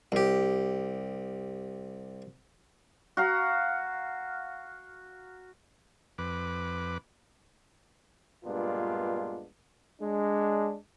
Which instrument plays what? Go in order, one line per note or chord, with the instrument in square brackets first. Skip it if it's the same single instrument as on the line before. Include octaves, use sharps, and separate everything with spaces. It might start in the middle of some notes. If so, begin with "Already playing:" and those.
[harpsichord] C2 G4
[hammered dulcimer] F#4 F5 A#5
[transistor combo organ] F2 B4 D6
[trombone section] G2 A#2 G#3 B3 D4 F4
G#3 D4